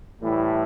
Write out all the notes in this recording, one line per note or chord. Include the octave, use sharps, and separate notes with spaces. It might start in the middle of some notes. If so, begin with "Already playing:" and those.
A2 E3 G3 A3